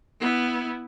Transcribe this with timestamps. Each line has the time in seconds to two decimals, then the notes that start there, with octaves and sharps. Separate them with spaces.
0.20 B3 E4